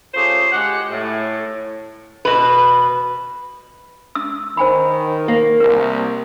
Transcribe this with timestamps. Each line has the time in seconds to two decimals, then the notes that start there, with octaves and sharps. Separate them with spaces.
0.14 A3 C#4 F4 G4 G#4 C5
0.52 G#3 G4 F#5
0.90 A2
2.25 B2 B4
4.15 E6
4.57 D#3 C5 G#5 B5
5.28 A#3
5.60 C2 A#4